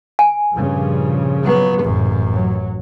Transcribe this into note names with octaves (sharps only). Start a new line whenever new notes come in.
G#5
G2 A#2 C#3 F3
F#3 B3
A1 F#2
F#3